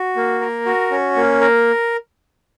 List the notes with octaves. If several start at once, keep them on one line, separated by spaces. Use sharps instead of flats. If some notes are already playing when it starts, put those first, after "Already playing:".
Already playing: F#4
A#3
A#4
F#4
C#4
A#3
A#4